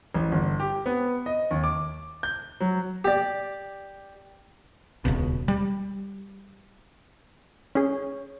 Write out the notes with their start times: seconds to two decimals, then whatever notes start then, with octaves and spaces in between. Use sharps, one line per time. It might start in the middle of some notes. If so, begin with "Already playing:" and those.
0.14 A1
0.32 G1
0.59 G4
0.86 B3
1.26 D#5
1.51 D#2
1.64 D6
2.23 G6
2.60 F#3
3.05 G4 D5
5.05 D#1 C#2 B2
5.48 G3
7.75 C#4 G#4 C#5